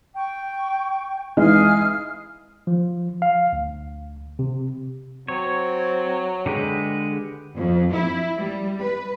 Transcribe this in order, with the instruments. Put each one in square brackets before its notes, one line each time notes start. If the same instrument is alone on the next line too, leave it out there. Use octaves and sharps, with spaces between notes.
[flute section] G5 C#6
[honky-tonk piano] E3 G#3 D#4 [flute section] G#4 F5 F6
[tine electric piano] F3
F5
D2
C3
[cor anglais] F#3 [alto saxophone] C4 [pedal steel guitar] C#5
[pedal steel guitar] D3 G4 B4 [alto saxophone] G#3
[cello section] F2
E4
G3
B4